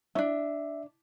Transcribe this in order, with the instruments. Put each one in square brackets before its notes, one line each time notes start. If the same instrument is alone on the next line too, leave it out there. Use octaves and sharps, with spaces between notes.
[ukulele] C#4 D4 [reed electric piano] E5